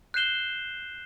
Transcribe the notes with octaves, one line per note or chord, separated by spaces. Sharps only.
F#6 G6 C7 E7 G7